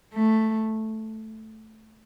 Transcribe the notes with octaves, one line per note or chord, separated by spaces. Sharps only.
A3